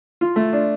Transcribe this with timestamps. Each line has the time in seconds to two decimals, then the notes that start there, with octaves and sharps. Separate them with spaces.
0.21 F4
0.36 A3
0.53 D4